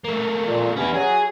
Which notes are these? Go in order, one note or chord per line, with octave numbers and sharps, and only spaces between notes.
A3 A#3
A#2
G2 B3 C#4 E4
F#3 G#4 G#5